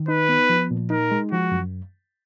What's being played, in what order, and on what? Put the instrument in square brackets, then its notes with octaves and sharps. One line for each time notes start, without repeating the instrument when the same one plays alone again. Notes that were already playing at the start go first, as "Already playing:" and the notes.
Already playing: [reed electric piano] D#3
[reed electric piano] D#4 [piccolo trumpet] B4
[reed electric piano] B3
F3
A#2
[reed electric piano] D#4 [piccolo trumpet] A#4
[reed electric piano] G#3
[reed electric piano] F3 [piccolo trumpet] F#4
[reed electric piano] F#2